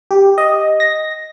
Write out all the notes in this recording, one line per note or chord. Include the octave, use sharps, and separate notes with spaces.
G4
D#5
A#6